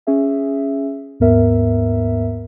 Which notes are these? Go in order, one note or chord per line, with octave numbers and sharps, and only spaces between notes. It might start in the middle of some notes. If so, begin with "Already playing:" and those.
C#4 G#4 E5
D#2 G#2 B3 A#4 E5